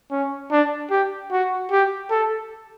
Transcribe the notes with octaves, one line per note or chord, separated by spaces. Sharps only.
C#4
D4
G4
F#4
G4
A4